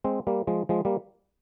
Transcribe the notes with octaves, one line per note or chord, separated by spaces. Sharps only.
G#3 C4
G3 A#3
F3 G#3
F3 G#3
G3 A#3